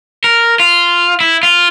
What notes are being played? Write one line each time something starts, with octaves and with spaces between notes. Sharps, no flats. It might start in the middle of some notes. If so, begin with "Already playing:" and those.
A#4
F4
E4
F4